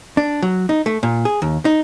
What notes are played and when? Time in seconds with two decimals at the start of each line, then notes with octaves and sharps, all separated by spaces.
0.17 D4
0.42 F#3
0.69 D#4
0.86 A3
1.03 A#2
1.25 G#4
1.42 D#2
1.65 D#4